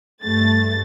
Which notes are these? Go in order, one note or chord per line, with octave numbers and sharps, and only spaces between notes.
G2 A3 A6